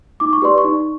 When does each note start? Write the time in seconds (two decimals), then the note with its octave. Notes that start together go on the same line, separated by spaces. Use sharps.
0.20 D#4 D6
0.33 C#6
0.42 G4 B4 D5 C6
0.58 C#6
0.64 D#4